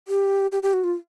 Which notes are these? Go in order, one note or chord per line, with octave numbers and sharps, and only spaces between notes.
G4
G4
G4
F#4
F4